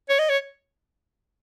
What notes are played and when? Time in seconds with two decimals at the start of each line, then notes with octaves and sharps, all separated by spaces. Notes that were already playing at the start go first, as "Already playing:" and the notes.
0.09 C#5
0.19 D#5
0.29 C#5